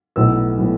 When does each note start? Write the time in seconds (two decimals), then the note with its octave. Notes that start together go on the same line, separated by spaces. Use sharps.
0.16 B1 A2 F#3 B3 E6
0.58 A2 F#3 B3